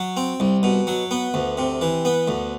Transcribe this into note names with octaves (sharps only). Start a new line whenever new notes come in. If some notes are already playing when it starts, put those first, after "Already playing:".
Already playing: F#3
C4
C2
B2
F#3
B3
D2
C3
E3
B3
D2